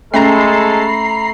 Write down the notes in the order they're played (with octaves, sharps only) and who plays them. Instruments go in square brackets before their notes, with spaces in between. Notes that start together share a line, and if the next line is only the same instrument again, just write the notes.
[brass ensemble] G#3 A4 [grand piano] A3 [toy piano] C#4 [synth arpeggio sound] A#5 B5 C7